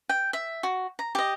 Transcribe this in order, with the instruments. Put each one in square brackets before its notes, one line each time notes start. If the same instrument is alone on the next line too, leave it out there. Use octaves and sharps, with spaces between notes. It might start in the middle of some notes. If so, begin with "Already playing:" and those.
[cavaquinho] G5
E5
F#4
A#5
G4 D#5